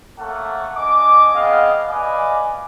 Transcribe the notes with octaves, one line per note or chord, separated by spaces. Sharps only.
A3 A#3 C#4 A4 F#5
D4 D#5 G#5 D6
B3 C4 G#4 D#5 F5
B4 D5 D#5 F5 G#5 D6